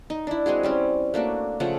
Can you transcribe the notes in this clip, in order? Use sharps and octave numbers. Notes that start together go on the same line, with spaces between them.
D#4
D4 E4
G#3 C4 F#4 G#4
G3 C4 C#4
A3 A#3 D4 F#4
C#3 F3 A3 F#5